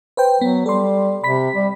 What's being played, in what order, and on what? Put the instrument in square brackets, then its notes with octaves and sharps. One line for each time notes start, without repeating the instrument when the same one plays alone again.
[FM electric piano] B4 C5 G5
[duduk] F#3 [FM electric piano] B3
[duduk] G3 [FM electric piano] A4 C6
[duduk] C3 [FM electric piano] B5 B6
[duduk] G3